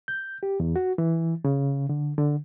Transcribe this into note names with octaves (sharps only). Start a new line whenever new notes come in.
G6
G4
E2
F#4
E3
C#3
D3
D3